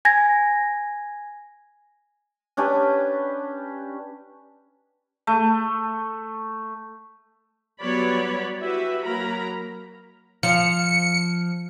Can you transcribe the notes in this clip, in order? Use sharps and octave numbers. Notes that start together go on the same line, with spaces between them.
G#5 G#6 A#6
C#4 D4 G4 B4
A3
F#3 G3 B3 C#5 D5 B5
E4 F#4 G4 B4 E5
F#3 A#3 A#4 A#5 B5
F3 C#7